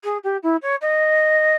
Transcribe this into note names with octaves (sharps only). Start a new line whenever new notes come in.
G#4
G4
E4
C#5
D#5